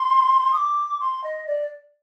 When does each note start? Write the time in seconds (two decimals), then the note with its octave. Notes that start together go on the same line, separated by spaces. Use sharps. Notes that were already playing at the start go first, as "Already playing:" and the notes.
Already playing: C6
0.53 D#6
0.57 D6
1.00 C6
1.24 D#5
1.47 D5